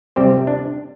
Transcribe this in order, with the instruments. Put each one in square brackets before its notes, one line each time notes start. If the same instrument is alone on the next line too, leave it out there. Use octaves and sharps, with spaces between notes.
[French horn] C3 [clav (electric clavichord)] G3 C4 G4 C5
[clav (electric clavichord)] D4